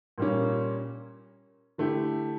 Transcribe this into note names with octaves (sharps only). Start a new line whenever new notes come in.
A#2 G3 A#3 C#4
D3 A3 E4 G4